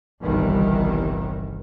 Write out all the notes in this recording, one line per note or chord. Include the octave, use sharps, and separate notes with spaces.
G1 C2 B2 D#3 E3